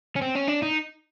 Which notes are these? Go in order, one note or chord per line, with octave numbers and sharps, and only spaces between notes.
C#4
C4
C#4
D4
D#4